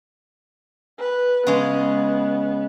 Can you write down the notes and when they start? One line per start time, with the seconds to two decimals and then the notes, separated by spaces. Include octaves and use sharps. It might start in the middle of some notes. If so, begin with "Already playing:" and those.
0.99 B4
1.47 C#3 G#3 B3